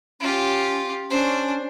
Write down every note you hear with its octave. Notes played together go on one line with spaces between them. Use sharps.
C#4 F4 G4
C#4 D4 C5